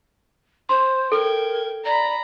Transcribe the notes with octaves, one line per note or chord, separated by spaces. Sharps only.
C5 C6
A4 A#4 G5 G#6
D5 A#5 B5